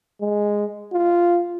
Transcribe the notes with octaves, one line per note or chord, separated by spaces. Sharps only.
G#3
F4